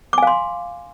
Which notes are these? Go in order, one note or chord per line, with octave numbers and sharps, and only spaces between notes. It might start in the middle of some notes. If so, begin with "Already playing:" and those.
F5 G#5 C6 D6